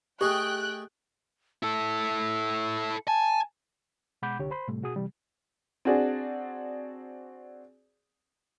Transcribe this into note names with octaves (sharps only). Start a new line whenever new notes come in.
A3 G4 G#4 D#5 G5 F#6
E4 A4 E6
G#5 A5
B2 G#3 F#5 B5 D6 G6
C2 D3 G4 C#5
C5 B5 C6
A2 C3 G3 A3
B2 F#4 G#4 D#6
C3 E3 G3
C4 D4 F#4 G#4 D5